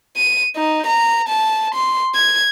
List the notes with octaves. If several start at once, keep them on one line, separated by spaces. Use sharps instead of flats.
D#7
D#4
A#5
A5
C6
G#6